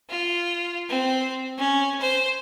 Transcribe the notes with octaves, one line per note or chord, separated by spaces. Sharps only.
F4
C4
C#4
C5